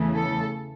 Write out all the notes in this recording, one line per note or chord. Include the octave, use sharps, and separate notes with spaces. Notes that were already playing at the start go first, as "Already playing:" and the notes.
Already playing: E2 C#3 E3 A3
A4